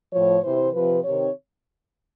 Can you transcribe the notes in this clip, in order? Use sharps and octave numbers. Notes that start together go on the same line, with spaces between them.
A2 F3 C#5
C3 E3 C5
C3 F3 B4
C3 D#3 C#5